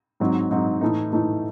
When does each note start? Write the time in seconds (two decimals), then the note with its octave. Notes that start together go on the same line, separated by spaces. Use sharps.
0.20 G#2 F#3 C4 D#4
0.51 G#2 F#3 C4 D#4
0.81 A2 E3 A3 D#4
1.13 A2 E3 A3 D#4